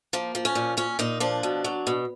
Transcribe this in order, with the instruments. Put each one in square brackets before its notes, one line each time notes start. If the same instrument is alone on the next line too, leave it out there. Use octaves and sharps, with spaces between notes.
[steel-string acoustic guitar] F3 A#3
F3
C#4
A#2
A#2 C#4
A#2 D#4
F3 D4
B2
F#3
B2